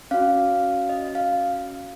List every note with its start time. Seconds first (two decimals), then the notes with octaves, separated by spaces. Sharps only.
0.11 C#4 F#4 F5
0.89 D#5
1.15 F5